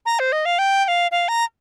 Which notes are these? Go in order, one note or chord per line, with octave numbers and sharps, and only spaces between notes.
A#5
C5
D#5
F5
G5
G5
F5
F5
A#5